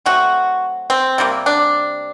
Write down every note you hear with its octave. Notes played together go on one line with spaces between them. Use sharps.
F#3 A3 C4 F#4
C4
C3 G3 A#3
D4